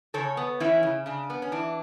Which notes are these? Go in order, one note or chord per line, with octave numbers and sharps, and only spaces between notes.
C#3 A4 C#5
B3
E3 C#4 E4
C#3
C#3 D4
B3
C#4
E3 D4